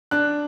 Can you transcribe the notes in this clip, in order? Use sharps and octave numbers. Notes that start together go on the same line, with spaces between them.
D4 F#6